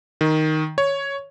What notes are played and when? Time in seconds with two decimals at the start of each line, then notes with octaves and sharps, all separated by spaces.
0.21 D#3
0.78 C#5